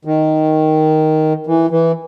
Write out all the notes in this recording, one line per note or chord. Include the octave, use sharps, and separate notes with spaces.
D#3
E3
E3